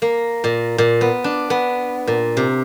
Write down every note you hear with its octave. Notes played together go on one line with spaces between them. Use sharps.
A#3
A#2
A#2
B3
D4
B3
A#2
C3